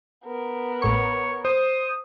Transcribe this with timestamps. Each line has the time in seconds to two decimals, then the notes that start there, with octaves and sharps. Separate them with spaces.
0.25 B3 A#4
0.82 A1 A2 C#5 C#6
1.45 C5 D#6